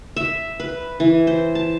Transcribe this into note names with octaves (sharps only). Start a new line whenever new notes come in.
E5
B4
E3
C5
A5